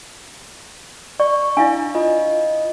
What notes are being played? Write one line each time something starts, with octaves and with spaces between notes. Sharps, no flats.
D5 C#6
D4 E4 F5 G#5
F4 D#5